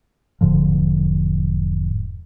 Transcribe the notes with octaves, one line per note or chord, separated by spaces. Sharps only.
E1 G#2 D3 F3